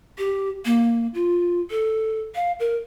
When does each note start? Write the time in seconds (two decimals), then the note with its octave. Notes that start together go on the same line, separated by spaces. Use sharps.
0.18 G4
0.65 A#3
1.14 F4
1.71 A4
2.35 F5
2.60 A#4